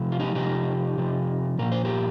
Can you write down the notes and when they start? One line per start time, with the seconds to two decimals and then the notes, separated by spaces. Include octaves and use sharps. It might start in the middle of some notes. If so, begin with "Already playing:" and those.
Already playing: C3 F3
0.12 F4
0.20 D#4 G4
0.35 C3 F3 D#4 G4
0.98 C3 F3
1.59 A#2 F3 A#4
1.72 C5
1.85 G4 A#4